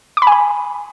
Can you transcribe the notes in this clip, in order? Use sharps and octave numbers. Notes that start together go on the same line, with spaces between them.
D6
B5
G#5
B5